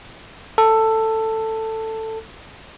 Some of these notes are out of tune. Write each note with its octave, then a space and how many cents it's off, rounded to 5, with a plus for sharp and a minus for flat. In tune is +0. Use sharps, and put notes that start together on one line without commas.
A4 +10